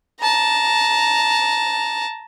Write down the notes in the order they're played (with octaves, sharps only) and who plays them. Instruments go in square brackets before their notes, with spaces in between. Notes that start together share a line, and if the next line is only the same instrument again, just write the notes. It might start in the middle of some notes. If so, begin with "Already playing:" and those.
[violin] A5 A#5